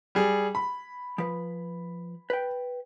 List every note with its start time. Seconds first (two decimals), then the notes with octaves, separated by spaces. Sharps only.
0.15 G3 G#4
0.55 B5
1.18 F3 B4
2.30 B4 G5